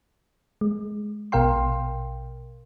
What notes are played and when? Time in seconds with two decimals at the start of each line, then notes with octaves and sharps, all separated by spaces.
0.61 G#3
1.32 A#1 B2 A#4 F5 G5 C6